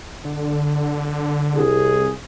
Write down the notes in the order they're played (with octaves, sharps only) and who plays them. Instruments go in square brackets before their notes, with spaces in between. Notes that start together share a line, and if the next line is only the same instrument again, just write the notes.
[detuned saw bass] D3
[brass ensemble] C2 G#4